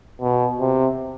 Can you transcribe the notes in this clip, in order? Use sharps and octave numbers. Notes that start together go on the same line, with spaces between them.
B2
C3